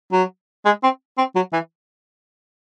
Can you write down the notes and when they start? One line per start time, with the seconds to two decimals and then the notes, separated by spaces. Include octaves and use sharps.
0.12 F#3
0.65 G#3
0.83 C4
1.18 C4
1.36 F#3
1.53 E3